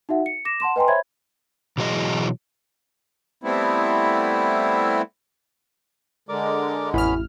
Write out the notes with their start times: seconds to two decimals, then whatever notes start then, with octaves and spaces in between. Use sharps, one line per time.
0.09 D#4 F#4 E5 F#5
0.26 C#7
0.45 D6 A#6 E7
0.60 F#5 A5 C6 E7
0.76 B4 D#5 G5 G#5 A#5 C6
0.88 C5 C#5 E5 B5 G#6
1.78 B2 E3 F#3 G#4 D#5
3.44 G3 A3 B3 C4 E4
6.29 D3 G#3 A#4 D5 D6
6.94 A1 F2 B3 C#4 E4 B5 F6